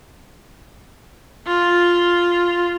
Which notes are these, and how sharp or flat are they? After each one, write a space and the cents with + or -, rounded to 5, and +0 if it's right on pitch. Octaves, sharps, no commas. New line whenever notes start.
F4 +0